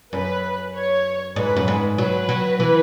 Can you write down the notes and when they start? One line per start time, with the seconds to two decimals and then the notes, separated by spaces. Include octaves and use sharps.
0.13 F#2 B4
0.75 C#5
1.36 G#2 B4
1.56 F#2
1.68 G#2
1.98 F#3 B4
2.29 F#3
2.60 E3